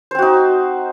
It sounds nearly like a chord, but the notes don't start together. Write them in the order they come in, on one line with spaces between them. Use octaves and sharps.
C5 C4 F#4 D#4